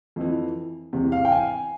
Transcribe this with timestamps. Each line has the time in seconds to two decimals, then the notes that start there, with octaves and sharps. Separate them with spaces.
0.16 F2 E3
0.93 E2 C3 E3
1.12 F5
1.25 G5
1.32 G#5